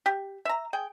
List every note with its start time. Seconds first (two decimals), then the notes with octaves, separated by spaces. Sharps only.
0.06 G4
0.45 E5 A#5
0.73 G#4 G5